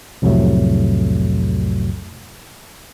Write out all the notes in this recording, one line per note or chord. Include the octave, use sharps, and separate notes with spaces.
C2 F2 A2 C3 F#3 A3